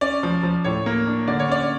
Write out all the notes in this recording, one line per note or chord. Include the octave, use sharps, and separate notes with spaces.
C#4 D5
F3
F3
A2 C#5
A#3
D4
D3 D5
C#5
C#4 D5